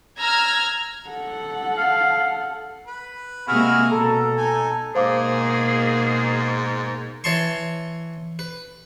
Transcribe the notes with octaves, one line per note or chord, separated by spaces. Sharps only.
A#5 E6 F6 G#6
A4 F#5
F5
B4
C3 G#3 A#3 E4 F#4 G#4 F6
B2 A4 A#5
D#4 G#5
G#2 B2 A#3 G#4 C5 F5 D6
E3 C#5 A5 C6 C#6
B4